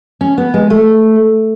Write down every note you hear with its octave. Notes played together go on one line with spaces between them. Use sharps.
C#4
B3
G#3
A3